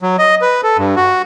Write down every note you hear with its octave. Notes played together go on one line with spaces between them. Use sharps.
F#3
D#5
B4
A4
G2
F#4